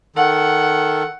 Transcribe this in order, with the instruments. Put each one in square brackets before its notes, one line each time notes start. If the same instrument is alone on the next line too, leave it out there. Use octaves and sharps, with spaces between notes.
[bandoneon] D#3 A4 [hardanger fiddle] F#5